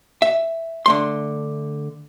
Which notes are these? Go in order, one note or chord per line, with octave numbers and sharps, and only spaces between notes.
E5
D3 A3 C6